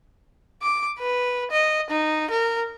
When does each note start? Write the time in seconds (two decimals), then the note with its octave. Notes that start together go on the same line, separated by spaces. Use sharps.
0.62 D6
0.99 B4
1.52 D#5
1.91 D#4
2.31 A#4